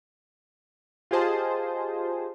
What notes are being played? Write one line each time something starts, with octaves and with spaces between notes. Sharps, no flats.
F4 G4 G#4 C5 D#5 A5